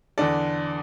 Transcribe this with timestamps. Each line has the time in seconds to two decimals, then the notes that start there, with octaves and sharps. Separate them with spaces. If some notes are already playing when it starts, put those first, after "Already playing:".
0.18 E2 D3 A4 D5